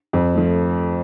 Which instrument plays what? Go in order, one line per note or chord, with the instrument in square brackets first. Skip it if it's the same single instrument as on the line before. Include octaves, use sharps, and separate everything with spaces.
[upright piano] F2
F3 A3